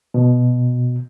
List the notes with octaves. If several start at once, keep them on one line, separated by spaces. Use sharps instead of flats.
B2